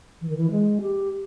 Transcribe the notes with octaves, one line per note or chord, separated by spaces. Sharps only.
E3
D#3
E3
G#3
G4